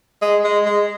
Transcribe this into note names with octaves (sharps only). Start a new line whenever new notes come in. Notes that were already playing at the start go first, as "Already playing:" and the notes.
G#3
G#3
G#3